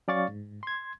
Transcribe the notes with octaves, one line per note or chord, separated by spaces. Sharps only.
F#3 C#4 D5 F5 C#6 A6
G#2
C6 G#6